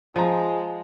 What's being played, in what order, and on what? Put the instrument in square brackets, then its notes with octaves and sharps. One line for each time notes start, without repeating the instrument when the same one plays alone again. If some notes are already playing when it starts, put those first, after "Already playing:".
[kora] F3 [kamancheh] G#3 [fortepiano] C5 A#5